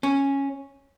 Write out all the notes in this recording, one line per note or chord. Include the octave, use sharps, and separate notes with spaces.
C#4